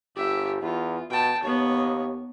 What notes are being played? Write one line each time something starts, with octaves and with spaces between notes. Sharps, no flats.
G1 G4 E5
E2 F4
B2 G5 A5
D#2 B3 C#5